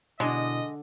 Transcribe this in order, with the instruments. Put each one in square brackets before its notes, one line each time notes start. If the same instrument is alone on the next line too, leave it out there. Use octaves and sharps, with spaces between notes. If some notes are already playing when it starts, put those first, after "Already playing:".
[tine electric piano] B2 E4 [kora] D3 D4 [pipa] G#3 [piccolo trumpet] D#5